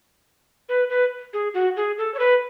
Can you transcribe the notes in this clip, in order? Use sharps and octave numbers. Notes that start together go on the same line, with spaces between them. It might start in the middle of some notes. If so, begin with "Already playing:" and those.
B4
B4
G#4
F#4
G#4
A4
C#5
B4